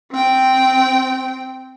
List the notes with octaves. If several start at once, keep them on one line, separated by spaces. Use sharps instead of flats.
C4 G5